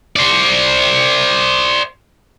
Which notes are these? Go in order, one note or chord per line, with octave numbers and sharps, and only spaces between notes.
C5 D5